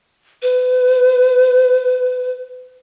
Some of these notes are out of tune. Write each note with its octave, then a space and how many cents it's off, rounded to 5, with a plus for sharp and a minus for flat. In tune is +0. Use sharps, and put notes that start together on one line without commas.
B4 +35